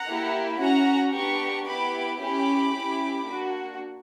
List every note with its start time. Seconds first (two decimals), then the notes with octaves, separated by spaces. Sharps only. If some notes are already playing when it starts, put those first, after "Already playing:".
Already playing: F#5 A#5
0.08 A#3 E4 G4
0.61 C#4 F#4 F#5 A#5
1.14 B3 D4 G4 A#5 C#6
1.67 B3 E4 G4 B5 D6
2.20 C#4 E4 G4 B5 D6
2.73 C#4 E4 G4
3.25 A#3 D4 F#4